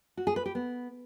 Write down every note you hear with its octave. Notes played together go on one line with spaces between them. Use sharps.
F#4
G#4
B4
G4
B3